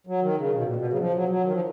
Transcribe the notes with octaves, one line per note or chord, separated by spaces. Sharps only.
F#3
D#3
C#3
B2
A#2
B2
C#3
F#3
F3
F#3
F#3
D#3
F3